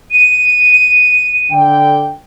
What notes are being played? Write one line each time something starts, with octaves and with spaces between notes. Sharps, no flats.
D#7
D3 G5